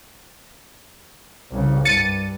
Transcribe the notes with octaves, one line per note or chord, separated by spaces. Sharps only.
C2 C#3
G2 A6 C#7 D#7